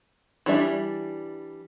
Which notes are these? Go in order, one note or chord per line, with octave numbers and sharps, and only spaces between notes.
E3 G3 D4 E5